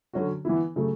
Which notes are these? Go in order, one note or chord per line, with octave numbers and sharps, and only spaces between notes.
D3 F#3 C#4 F#4
E3 B3 E4
C#3 F#3 A3